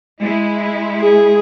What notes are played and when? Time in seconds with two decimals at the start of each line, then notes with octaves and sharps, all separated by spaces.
0.22 G#3 E4
1.01 G#4